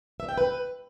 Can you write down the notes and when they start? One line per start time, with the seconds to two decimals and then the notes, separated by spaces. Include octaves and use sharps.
0.20 E5
0.29 G5
0.38 B4